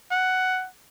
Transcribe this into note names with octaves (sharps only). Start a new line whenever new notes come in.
F#5